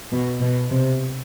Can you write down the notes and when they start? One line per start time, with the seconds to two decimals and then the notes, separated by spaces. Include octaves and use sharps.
0.12 B2
0.41 B2
0.70 C3